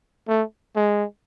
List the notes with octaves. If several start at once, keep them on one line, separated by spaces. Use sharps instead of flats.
A3
G#3